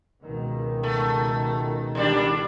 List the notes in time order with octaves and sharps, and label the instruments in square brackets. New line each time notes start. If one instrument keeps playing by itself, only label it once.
[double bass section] C#2 B2 D#3
[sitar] A3
D#2 G3 D4